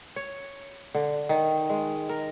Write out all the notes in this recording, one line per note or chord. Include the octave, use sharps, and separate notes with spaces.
C#5
D3
D#3
G#3
A#4